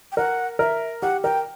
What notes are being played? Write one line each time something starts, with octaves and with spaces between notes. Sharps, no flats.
G5
A#4 F#5
A#4 E5
G4 F#5
A#4 G5